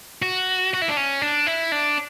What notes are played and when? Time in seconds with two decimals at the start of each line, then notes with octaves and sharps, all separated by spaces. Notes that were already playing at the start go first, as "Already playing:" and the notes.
0.22 F#4
0.74 F#4
0.82 E4
0.89 D4
0.97 C#4
1.22 D4
1.47 E4
1.72 D4